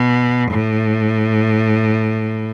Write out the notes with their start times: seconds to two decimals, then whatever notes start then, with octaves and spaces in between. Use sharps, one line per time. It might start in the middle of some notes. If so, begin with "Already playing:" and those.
Already playing: B2
0.51 A2